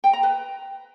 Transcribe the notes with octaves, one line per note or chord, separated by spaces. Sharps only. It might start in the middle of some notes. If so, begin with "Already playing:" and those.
G5
A#5
B4